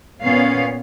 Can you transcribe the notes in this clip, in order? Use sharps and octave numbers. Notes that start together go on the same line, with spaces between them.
A#2 B3 C#4 C#5 F5